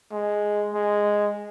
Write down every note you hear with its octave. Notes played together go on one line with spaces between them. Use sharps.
G#3
G#3